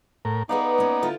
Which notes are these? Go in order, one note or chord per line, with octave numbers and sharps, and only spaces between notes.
A2 A#4
B3 D#4 G#4 B4 D5 F5
A#3 C#4
D3 E4 F4